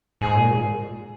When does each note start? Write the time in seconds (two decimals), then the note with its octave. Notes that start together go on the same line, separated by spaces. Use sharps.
0.21 G#2 G#4
0.36 A#2
0.51 G#3